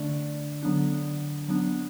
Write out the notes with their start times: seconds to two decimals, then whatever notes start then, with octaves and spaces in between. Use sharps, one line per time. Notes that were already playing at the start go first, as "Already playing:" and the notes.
Already playing: D3 A3 D4 D5
0.63 D3 F#3 B3 D4
1.48 F#3 B3 D4